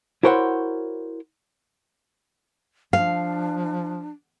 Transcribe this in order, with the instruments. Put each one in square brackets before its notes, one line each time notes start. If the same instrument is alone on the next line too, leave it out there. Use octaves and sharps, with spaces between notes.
[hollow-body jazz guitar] E4 F#4 A#4 C5 C#5 F#5
[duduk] F3 [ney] D4 [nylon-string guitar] F5